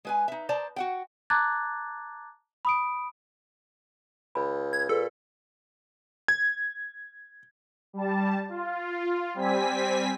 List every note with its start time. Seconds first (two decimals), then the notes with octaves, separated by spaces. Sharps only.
0.05 G#3 B4 G#5
0.28 D#4 E5
0.49 C5 D5 A5 A#5
0.76 F#4 F#5 G5
1.30 A5 A#5 D6 F#6 G#6 A6
2.65 B5 D#6 D7
4.35 C#2 B5
4.73 G#6
4.89 A#2 G#4 A4 B4
6.28 G#6
7.93 G3 A5
8.49 F4
9.34 G3 C4 G#5 B6